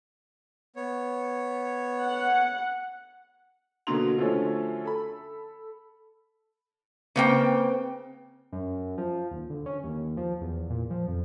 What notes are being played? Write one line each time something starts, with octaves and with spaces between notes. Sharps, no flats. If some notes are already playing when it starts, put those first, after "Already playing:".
B3 C#5
F#5
B2 D3 F#3 A#3 C6 F7
D3 F3 F#3 A3 C#4
A4 B5
C#3 A#3 C4 B4 C5 G5
F#2
F3
D#1
D2
C#4
D#2
F3
E2
A#2
F3
F2